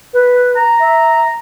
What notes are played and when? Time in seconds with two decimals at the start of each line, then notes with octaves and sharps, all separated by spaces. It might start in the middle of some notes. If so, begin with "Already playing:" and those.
0.14 B4
0.57 A#5
0.80 E5